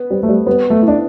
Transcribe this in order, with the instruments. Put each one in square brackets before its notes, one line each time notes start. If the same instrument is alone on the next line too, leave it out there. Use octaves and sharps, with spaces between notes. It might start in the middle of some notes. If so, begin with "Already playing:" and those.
Already playing: [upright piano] B3 B4
[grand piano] G3 [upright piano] C4
[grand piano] A3
G3
[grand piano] G3 [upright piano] B3
[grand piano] A3
[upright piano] E4
[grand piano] D4